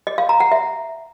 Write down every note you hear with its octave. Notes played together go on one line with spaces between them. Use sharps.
D#5
F5
A#5
F#5
E5